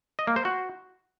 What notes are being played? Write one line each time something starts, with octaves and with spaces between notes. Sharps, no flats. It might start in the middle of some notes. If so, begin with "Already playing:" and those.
D#5
A#3
C5
F#4